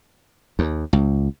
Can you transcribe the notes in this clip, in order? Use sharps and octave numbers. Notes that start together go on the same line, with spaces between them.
D#2
C#2